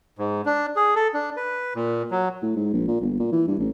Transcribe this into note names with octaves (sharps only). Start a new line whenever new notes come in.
G#2
D4
G#4
A4
D4
B4
A#2
F#3
A2
G#2
A#1
A#2
G1
A#2
E3
G2
A1